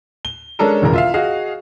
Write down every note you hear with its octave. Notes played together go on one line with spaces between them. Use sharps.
G7
G#3 C#4 D4 A4 A#4
E1 A1 C#3 A#4
F4 E5 F5
F#4 G#4 D#5 F5